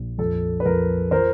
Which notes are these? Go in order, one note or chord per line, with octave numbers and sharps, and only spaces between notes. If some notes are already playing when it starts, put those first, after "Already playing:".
Already playing: A#1
F2 A4
B4
F2 A#4
F3 A#4 C5